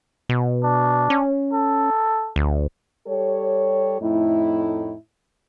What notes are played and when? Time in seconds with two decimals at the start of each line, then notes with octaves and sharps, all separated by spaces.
0.29 B2
0.64 D4
1.10 C#4
1.53 A4
2.36 D2
3.07 G3 G4 A4 C#5
4.01 F2 A2 A3 D#4 E4